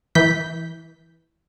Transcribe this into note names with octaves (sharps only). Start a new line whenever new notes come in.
E3 G6 B6